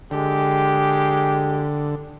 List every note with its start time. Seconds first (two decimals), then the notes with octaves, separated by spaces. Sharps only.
0.11 D3 G#3 G4